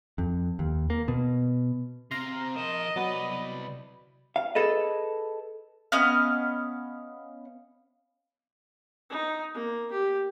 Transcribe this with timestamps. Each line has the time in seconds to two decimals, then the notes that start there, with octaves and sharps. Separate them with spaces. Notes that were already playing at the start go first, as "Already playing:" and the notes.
0.18 F2
0.59 D#2
0.90 A#3
1.08 B2
2.11 C3 C4 F5 A#5 C6
2.56 F3 A#4 D#5 E7
2.96 C2 F#3 B3 D5 B5
4.36 F5
4.55 G#4 A4 B4 D#5
5.92 B3 C#4 D#5 F5
9.10 D#4
9.54 A#3
9.91 G4